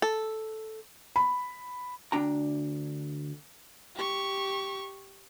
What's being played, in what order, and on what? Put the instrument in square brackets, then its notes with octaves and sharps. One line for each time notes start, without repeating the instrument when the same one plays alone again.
[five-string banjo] A4
[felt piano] B5
[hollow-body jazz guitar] D2 D4 G5 A#5
[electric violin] G4 C#6